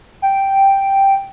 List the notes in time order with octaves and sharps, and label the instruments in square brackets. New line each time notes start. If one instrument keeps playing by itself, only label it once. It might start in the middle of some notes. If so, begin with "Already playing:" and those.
[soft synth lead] G5